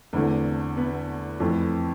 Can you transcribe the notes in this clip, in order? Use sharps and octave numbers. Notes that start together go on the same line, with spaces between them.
E2 D3 A3 C4
B3 B4
F2 E3 A3 C4